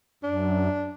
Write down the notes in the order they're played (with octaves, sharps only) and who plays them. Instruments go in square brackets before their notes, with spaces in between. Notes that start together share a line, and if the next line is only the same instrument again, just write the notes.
[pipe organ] F#2 [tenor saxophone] D4